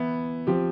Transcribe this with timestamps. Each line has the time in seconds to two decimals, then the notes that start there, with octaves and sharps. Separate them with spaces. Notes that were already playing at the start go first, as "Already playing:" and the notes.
Already playing: E3 B3 E4
0.47 F3 C4 G4